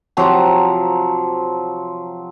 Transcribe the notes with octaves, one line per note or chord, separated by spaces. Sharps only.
C3 F3 F#3 A#5